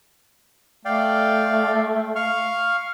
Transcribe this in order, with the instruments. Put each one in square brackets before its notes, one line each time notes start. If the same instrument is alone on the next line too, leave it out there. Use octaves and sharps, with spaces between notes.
[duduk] A3 [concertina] D5 F5 G5
[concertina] F5 C#6 F6